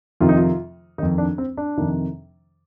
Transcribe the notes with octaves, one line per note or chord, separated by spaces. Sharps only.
F2 C3 D#3 F4
D#4
F4
F2 D#3 D#4
D4
C4
D4
F2 C3 D#3